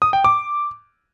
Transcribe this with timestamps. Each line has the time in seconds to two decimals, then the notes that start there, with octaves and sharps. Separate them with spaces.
0.02 D#6
0.13 G5
0.24 D6